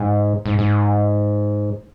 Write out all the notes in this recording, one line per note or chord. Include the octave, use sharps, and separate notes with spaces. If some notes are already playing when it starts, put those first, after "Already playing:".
Already playing: G#2
G#2
G#2